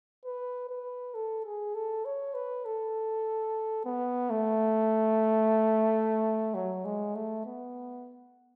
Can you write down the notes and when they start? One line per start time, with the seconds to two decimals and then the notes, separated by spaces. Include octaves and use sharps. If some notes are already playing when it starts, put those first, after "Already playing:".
0.25 B4
0.70 B4
1.14 A4
1.45 G#4
1.74 A4
2.05 C#5
2.34 B4
2.65 A4
3.85 B3
4.30 A3
6.54 F#3
6.85 G#3
7.15 A3
7.45 B3